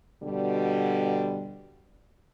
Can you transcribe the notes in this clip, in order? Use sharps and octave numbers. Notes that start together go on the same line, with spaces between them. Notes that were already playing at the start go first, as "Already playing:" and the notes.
B2 D3 G3